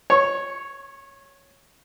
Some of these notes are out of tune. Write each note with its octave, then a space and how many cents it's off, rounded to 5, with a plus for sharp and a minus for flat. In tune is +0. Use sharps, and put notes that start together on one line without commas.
C#5 +0 C#6 -35